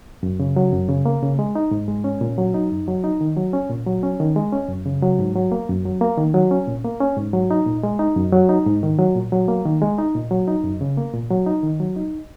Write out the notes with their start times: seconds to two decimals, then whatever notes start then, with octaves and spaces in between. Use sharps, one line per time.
0.23 F#2
0.40 C#3
0.56 F#3
0.73 F#2
0.89 C#3
1.05 A#3
1.22 C#3
1.39 G#3
1.55 D#4
1.71 G#2
1.88 G#3
2.04 C#4
2.21 A#2
2.38 F#3
2.54 D#4
2.71 F#2
2.88 F#3
3.04 D#4
3.21 D#3
3.37 F#3
3.53 C#4
3.70 A#2
3.86 F#3
4.03 C#4
4.20 D#3
4.36 G#3
4.53 C#4
4.69 F#2
4.86 C#3
5.02 F#3
5.19 G#2
5.35 F#3
5.52 A#3
5.69 F#2
5.85 F#3
6.01 A#3
6.18 D#3
6.34 F#3
6.51 C#4
6.67 A#2
6.85 A#3
7.00 C#4
7.17 G#2
7.33 F#3
7.51 D#4
7.66 A#2
7.83 G#3
7.99 D#4
8.16 F#2
8.32 F#3
8.49 D#4
8.66 G#2
8.83 D#3
8.99 F#3
9.16 A#2
9.32 F#3
9.48 A#3
9.65 D#3
9.82 G#3
9.98 D#4
10.15 A#2
10.31 F#3
10.48 D#4
10.64 F#2
10.81 C#3
10.97 A#3
11.13 A#2
11.31 F#3
11.47 D#4
11.63 D#3
11.80 F#3
11.96 D#4